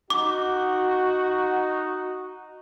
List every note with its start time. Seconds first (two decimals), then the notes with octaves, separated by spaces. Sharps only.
0.10 D#4 F#4 D6